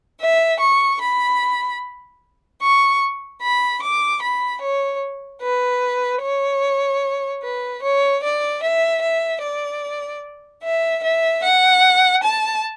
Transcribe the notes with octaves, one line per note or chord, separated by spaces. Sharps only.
E5
C#6
B5
C#6
B5
D6
B5
C#5
B4
C#5
B4
C#5
D5
E5
E5
D5
E5
E5
F#5
A5